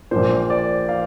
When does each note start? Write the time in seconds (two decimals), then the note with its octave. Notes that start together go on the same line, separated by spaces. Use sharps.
0.11 A#1 A#2 C5
0.50 D5
0.89 F5